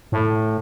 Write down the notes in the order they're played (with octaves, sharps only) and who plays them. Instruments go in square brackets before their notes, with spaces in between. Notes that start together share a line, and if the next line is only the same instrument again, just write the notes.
[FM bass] A2